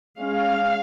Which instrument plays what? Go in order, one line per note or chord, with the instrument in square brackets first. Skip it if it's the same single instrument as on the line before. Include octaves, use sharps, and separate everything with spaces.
[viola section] G#3 C#4 F5